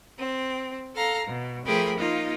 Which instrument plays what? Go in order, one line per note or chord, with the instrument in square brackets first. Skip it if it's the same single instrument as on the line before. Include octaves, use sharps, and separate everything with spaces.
[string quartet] C4
A4 F5 A#5
B2
F3 A3 G4 G#4 A#4 B5
A#3 D#4 F4